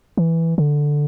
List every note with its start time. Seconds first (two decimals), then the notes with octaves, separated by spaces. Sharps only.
0.17 E3
0.58 D3